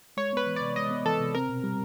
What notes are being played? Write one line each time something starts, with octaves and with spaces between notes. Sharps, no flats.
G#3 C#5
B3 B4
E3
C3 D5
G#3 D#5
B3
E3 A4
C3
C4 A#4
B2
G3